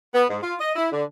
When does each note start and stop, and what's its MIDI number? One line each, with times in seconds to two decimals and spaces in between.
0.15 0.24 59
0.30 0.38 44
0.43 0.54 65
0.61 0.72 75
0.76 0.89 64
0.93 1.03 50